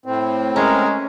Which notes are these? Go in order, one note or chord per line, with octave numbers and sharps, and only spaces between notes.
A2 C4
G#3 C#4 G#4 A#4 A#5